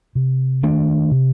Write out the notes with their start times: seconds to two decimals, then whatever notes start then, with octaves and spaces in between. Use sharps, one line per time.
0.15 C3
0.63 D#3 A3 D4
1.11 C3